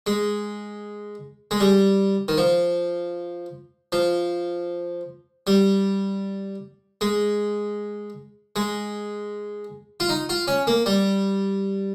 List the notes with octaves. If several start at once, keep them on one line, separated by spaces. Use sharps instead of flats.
G#3
G#3
G3
D#3
F3
F3
G3
G#3
G#3
F4
D#4
F4
C#4
A#3
G3